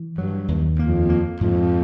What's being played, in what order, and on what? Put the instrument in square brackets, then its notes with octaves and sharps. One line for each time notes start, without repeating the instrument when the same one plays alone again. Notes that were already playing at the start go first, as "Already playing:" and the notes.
Already playing: [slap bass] E3
[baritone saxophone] G2 [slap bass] F#3
[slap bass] D#2
[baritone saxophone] F2 [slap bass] A#3
[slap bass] A#3
[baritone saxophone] F2 [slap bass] G#2